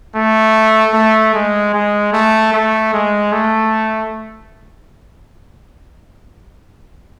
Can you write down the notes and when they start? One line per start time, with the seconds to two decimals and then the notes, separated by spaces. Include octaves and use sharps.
0.15 A3
0.94 A3
1.34 G#3
1.74 G#3
2.13 A3
2.53 A3
2.94 G#3
3.32 A3